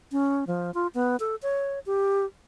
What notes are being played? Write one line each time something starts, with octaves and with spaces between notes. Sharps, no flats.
C#4
F3
F4
B3
A4
C#5
G4